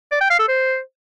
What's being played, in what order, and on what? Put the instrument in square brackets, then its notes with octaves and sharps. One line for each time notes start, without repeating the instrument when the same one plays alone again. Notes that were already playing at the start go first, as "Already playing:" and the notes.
[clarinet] D5
G5
F5
A4
C5